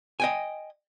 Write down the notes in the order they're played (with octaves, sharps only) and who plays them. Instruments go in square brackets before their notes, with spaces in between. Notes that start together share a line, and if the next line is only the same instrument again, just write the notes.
[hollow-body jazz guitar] D#5 G5 G#5